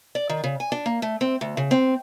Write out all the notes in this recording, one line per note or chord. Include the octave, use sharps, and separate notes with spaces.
D5
D#3
C#3
G#5
D4
A#3
A3
C4
D2
C#3
C4